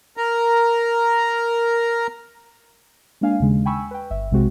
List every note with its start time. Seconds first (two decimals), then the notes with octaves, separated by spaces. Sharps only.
0.17 A#4 A#5
3.21 G#3 A#3 D4 F5 G#5
3.40 D#2 C#3 G#3
3.66 G5 G#5 B5 C#6 E6
3.91 B4 G5
4.10 G1 E5
4.31 B1 C3 G#3 C4 F#4